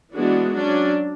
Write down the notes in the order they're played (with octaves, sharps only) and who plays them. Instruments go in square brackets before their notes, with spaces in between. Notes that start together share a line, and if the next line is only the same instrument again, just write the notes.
[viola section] E3 G#3 B3 D4 F#4
F#3 C#4 D4